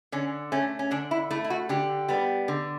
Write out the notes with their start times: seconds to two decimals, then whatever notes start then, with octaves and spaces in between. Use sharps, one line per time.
0.12 D3 C#4
0.52 A3 C#4
0.79 C#4
0.91 D3 D4
1.11 E4
1.31 A3 E4
1.44 E4
1.50 F#4
1.69 D3 G4
2.09 G3 B3
2.48 D3